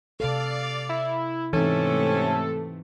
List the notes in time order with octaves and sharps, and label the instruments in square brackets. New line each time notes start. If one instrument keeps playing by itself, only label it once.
[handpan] C3 A4 [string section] D5 F5
[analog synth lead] E4
[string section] G#2 C3 A3 [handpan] E3 D#4 [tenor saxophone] C#4 [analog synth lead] A4